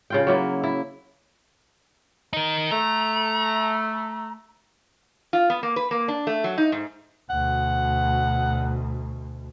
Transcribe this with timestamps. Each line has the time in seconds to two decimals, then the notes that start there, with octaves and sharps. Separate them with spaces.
0.10 C#3 F4 G5
0.27 F#3 A#3 E4
0.63 E4
2.33 D#4 A#4
2.71 A3 A#5
5.33 F4
5.50 B3
5.63 A#3
5.76 B4
5.91 A#3
6.08 D4
6.27 A3
6.44 F#3
6.58 D#4
6.72 G#2
7.30 D2 B2 F#5